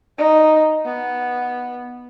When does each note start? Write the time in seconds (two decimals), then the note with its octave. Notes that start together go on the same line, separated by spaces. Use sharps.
0.18 D#4
0.86 B3